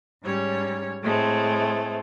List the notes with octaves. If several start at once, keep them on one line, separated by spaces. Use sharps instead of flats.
G#2 G3 C#4 C#5
A2 G#3 A3 C4